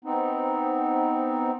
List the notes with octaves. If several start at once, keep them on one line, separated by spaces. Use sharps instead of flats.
B3 C4 D#4